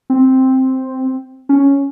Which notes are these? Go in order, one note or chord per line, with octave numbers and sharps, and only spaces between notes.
C4
C#4